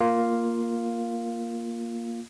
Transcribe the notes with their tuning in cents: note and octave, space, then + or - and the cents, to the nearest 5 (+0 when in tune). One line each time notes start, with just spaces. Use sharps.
A#3 +0 F4 +0 F5 +0